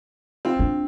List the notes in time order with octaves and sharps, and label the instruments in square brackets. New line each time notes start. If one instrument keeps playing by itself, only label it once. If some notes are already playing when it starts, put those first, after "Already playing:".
[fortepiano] C4 F4
[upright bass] D4